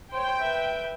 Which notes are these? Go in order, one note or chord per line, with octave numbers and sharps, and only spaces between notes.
C5 C#5 G5
B4 E5